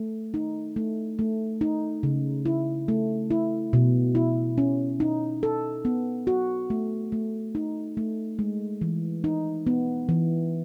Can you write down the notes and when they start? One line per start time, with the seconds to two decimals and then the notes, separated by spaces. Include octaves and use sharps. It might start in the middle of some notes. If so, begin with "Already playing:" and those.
Already playing: A3
0.34 D#4
0.76 A3
1.19 A3
1.61 D#4
2.03 C#3
2.46 E4
2.88 A3
3.31 E4
3.73 B2
4.15 E4
4.58 C#4
5.00 D#4
5.43 A4
5.85 B3
6.27 F#4
6.70 A3
7.12 A3
7.55 D#4
7.97 A3
8.39 G#3
8.81 E3
9.24 D#4
9.67 B3
10.09 E3